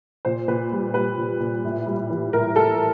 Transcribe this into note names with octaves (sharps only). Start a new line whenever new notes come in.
A#2 C5
A#2 B4
G3
G3 B4
A#2
A#2
A2
G3
E3
A2 A#4
A2 A4